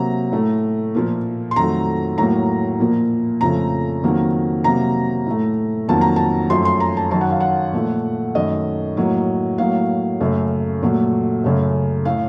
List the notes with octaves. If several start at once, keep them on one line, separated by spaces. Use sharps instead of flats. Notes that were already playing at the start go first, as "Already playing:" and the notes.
Already playing: C3 F#3 A#3 A#5
A2 A3
A#2 F3 A#3
C6
F2 D#3 F#3 A3 A#5
A2 F#3 A#3 A#5
A#2 F3 A#3
F2 C#3 F3 A3 A#5
F2 D#3 F#3 A#3
C3 F#3 A#3 A#5
A2 A3
F2 D#3 F#3 A#3 A5
A#5
A5
F#2 F3 A3 C6
C6
A#5
A5
F#2 D#3 F#3 A5
F#5
F5
F#5
A#2 F3 A3
F#2 D#3 A3 D#5
A2 F#3 A#3
A2 F#3 A#3 F5
F#2 C#3 A3
A#2 F#3 A3
F#2 C#3 A3
A2 A3 F5